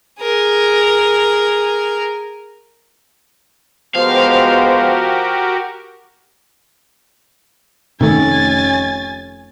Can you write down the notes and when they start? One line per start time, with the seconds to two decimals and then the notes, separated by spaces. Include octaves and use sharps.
0.21 G#4 A#4
3.95 F3 G#3 B3 F#4 G4 A#4 C5 F5
8.01 F1 C3 D#3 A3 C#4 G#5 A6